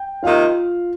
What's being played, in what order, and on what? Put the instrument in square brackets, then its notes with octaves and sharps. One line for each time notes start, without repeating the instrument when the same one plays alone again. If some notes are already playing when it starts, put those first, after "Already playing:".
Already playing: [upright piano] G5
[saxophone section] C3 D#3 A#3 [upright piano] F4 F5